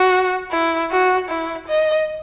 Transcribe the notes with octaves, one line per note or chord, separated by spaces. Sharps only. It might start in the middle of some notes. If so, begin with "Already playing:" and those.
Already playing: F#4
E4
F#4
E4
D#5